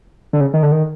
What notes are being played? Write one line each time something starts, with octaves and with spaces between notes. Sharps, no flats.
D3
C#3
D#3
D3
D#3